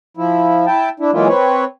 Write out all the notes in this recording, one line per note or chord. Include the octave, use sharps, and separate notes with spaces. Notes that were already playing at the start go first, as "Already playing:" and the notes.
F3 E4
E4 G5 A5
D4 E4
E3 F#3 G#3 A#3 E4 F4
C4 B4 C#5